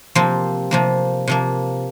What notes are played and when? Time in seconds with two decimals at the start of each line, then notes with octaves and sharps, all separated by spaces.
0.15 C3 F3 A#3 C4
0.71 C3 F3 A#3
1.28 C3 F3 A#3